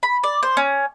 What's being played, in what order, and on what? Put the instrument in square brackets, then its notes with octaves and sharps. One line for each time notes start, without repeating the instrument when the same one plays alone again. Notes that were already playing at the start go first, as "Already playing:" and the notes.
[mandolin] B5
D5
C5
C#4